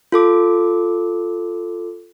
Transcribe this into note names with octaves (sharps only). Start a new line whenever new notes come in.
F4 A4 D6